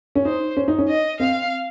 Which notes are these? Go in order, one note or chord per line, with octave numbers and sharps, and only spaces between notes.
C#4
D#4 C5
C#4
D#4
C#4
D#5
C4 F5